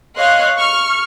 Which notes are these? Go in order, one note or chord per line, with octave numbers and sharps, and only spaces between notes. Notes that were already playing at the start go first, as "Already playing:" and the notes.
C#5 D#5 F5 C6 F#6
C#6 F6